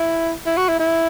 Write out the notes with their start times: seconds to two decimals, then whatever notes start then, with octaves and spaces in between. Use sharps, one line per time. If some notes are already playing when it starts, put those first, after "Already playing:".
Already playing: E4
0.46 E4
0.57 F#4
0.68 E4
0.79 E4